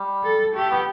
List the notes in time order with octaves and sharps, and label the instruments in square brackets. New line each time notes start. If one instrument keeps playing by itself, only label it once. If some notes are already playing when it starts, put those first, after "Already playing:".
Already playing: [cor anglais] G3
[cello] A4
[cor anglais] A3 [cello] G4
[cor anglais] B3